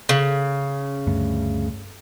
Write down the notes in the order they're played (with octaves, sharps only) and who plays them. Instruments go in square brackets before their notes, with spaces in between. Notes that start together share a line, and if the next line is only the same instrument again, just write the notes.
[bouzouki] C#3
[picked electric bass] D2 G2 A3